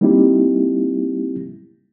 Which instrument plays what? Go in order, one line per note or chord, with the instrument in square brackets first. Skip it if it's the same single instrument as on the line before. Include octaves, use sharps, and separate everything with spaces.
[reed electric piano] G3 A#3 C4 D#4 E4 G4